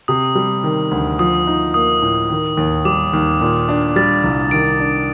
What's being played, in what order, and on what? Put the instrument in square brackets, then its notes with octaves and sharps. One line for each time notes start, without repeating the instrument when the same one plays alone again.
[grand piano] C3 [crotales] D#6
[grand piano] G3
D#3
D2
[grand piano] F3 [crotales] D#6
[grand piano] D#4
[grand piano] A#3 [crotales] D#6
[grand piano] A2
D#3
D#2
[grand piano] G3 [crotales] D6
[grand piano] D#2
A#2
D4
[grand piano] G3 [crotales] A6
[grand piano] C2
[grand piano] D#3 [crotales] D7
[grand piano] D4